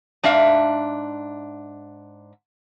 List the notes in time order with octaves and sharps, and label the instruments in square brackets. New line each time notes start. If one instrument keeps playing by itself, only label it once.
[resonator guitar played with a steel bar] G#2 D4 E5 F5